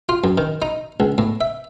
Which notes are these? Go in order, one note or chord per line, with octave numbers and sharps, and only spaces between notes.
F4
F#2
D#3
D#4
C#2
A2
E5